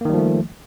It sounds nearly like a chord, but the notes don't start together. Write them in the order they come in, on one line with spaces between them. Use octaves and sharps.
A#3 D#3 G3 F3 A3